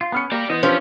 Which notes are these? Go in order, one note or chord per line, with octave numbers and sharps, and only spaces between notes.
F4
B3 C#4 B5 F6 C#7
A#3 G4 A#4 D5
E3 B3 C5 D#5
F3 C#4 D4 G4 B4 C5 E5